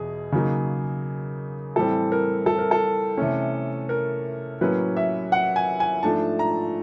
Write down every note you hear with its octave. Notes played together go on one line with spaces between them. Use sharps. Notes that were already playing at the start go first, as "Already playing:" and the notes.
Already playing: E2 B2 G#4
C#3 F#3 A#3 D#4
A2 E3 G3 C4 A4
A#4
A4
A#4
A4
C3 E3 A3 C#4
A#4
A2 F#3 A#3 C#4 B4
E5
F#5
G#5
G#5
G#2 F3 A3 D4 A5
A#5